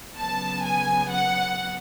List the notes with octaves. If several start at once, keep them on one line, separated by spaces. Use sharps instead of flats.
C#3 F#3 B3 A5
G#5
F#5